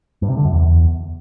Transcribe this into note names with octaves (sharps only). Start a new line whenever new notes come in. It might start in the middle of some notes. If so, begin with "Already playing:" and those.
G2
C3
D3
F#2
E2